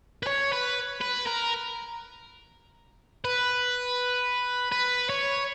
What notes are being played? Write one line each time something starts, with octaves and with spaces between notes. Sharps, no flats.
B4
C#5
B4
B4
A#4
B4
B4
C#5